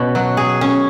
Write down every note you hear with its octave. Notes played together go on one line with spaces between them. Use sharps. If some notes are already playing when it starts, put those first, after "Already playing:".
Already playing: B2 C#4
F#3
G#4
C#4